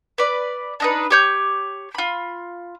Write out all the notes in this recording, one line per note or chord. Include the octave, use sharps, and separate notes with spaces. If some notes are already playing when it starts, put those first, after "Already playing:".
B4 D5
D4 D#4 B4
G4 C#5 G6
F4 B5